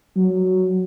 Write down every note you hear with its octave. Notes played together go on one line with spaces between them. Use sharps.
F#3